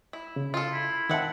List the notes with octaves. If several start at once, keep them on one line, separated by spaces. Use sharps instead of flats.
E4
C#3
F4 A4
E4
D#3 C4 E5 F#5 A5